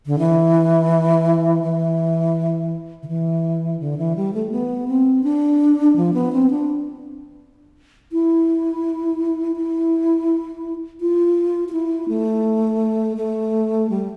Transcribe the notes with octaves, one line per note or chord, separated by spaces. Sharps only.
D3
E3
E3
D3
E3
D3
E3
G3
A3
B3
C4
D4
F3
B3
C4
D4
E4
E4
F4
F4
E4
A3
A3
G3